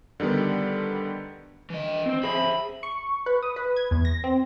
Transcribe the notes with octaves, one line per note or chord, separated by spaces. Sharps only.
D3 D#3 G3 B3
E3 D#5
C4 C5
G#4 C5 E5 B5
C#6
B4
D#6
B4
G#6
E2
A#6
C4